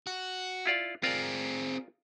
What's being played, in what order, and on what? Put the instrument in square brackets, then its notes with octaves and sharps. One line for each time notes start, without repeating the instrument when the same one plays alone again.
[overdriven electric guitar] F#4
[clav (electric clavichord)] E4 F4 D5
[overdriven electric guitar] C4 G#4 [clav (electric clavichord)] F4 A#4 D5